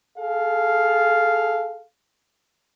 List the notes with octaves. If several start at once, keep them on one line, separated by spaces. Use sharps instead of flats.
G#4 A4 F5